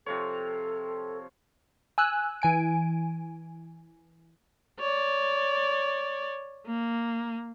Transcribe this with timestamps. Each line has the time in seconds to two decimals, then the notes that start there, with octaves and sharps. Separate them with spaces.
0.06 C3 F3 A4 C#5
1.98 G#5 E6 F#6
2.42 E3 G#5 D7
4.80 C#5 D5
6.67 A#3